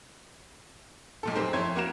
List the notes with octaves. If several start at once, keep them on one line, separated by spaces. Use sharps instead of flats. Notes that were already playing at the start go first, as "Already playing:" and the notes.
B1 A#2 A4
C4 G4 G#4 A#4 C5
F2 E4 C#5 C6 G#6
A#3 F#4 A#4 E7